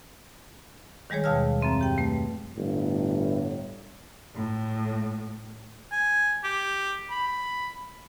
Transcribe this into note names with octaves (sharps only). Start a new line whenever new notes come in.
D#3 G3 G#3 G#4 C#5
D#2 B2 F5 A5 E6 F6
F#2 F3 C4 E5
G4 G5
A3 B4
G1 A2
A2
G#5
G4
B5